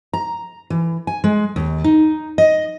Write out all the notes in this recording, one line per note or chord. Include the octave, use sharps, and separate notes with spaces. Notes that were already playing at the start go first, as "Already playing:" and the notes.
A#5
E3
G#5
G#3
D#2
D#4
D#5